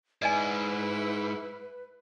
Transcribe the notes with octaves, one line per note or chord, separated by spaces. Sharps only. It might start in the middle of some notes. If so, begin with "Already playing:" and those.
G#2 E4 B4 D5 D#5 G#5